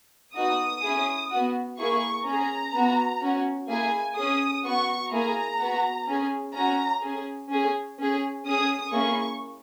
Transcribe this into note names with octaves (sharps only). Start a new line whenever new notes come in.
B3 D#4 F#4 D#6
C#4 E4 G#4
B3 F#4
A#3 E4 G#4 C#6
C#4 G#4 A#5
B3 F#4
C#4 F#4
A#3 E4 G#4 G#5
C#4 G#4 D#6
B3 F#4 C#6
A#3 E4 G#4 A#5
B3 F#4
C#4 G#4
C#4 F#4 A#5
C#4 G#4
C#4 G#4
C#4 G#4
C#4 G#4 D#6
A#3 C#4 E4 G#4 C#6